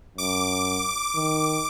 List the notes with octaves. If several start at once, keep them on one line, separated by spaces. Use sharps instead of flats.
F#2 D6
D#3